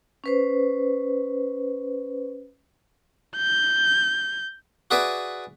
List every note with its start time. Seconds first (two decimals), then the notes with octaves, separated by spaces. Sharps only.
0.24 C#4 B4 C5
3.36 G6
4.91 F#4 G#4 B4 D5 E5